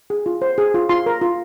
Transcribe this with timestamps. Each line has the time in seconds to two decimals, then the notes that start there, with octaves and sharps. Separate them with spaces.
0.10 G#4
0.26 F4
0.42 C5
0.58 G#4
0.74 F4
0.89 F4 C6
1.06 A#4
1.21 F4